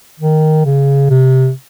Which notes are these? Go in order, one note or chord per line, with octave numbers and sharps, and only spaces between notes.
D#3
C#3
C3